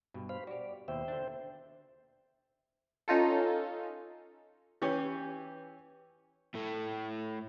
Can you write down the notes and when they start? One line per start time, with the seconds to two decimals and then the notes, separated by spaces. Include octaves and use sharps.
0.14 G2 B2
0.29 C5 F5 B5
0.47 F#4 G4 D5
0.88 D#2 B2 C5 E5 G5
1.08 D3 D4
3.08 C#4 D#4 F4 A4
4.82 E3 C#4 G4 C#5
6.54 A2 A3